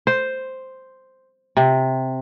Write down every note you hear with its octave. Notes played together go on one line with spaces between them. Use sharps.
C5
C3